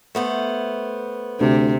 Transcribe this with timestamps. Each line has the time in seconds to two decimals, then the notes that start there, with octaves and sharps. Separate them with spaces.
0.15 A3 B3 C5
1.40 D2 C3